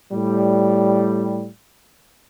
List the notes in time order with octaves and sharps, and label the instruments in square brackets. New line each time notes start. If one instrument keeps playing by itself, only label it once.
[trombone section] A2 G3